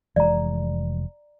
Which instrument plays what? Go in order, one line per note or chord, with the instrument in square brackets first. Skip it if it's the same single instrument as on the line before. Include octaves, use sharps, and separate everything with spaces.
[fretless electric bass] F1 E3 G#3 [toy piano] D5 A#5